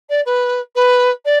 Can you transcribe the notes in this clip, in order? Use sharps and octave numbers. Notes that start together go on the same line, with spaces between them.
D5
B4
B4
D5